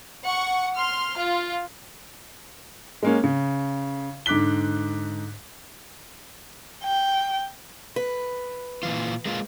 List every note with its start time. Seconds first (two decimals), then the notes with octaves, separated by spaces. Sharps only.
0.24 F#5 C#6
0.76 C6 F6
1.17 F4
3.03 G#3 A#3 C#4
3.24 C#3
4.26 G#2 D3 D6 F#6 B6 G7
6.83 G5
7.96 B4
8.83 A#2 E3 F4
9.26 G#3 A#3 F4